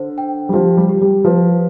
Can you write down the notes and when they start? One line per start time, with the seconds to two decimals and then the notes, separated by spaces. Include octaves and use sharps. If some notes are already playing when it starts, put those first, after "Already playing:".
Already playing: D3 C5
0.18 G5
0.49 G3
0.53 F3 G4
0.77 G3
0.89 G4
1.01 G3
1.25 F3 B4